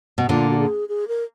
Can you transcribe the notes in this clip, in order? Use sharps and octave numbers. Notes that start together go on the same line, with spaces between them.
B2
A#2 D3 F4
F#4
G#4
G#4
A#4